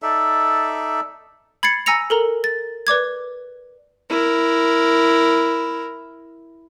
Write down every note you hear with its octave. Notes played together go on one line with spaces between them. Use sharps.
D#4 A4 D5 E5
B5 G#6 A6 C7 C#7
G#5 A#5 E6 A#6 C#7 F7
A4 A#4 A#5
A6
B4 D5 D6 G#6
E4 A#4